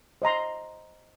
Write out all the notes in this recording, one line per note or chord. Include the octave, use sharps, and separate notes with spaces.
C5 D#5 A#5 C6